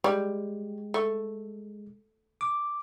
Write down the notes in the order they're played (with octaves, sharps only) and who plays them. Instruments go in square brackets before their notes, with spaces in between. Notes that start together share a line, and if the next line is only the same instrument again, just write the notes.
[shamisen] G3 [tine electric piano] G#3
[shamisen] A3
[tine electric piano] D6